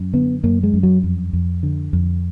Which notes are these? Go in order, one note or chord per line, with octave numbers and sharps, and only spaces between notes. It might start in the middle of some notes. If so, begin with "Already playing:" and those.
Already playing: F#2
D3 B3
F#2 A#3
G#3
F#2
F#3
F2
F2
D3
F2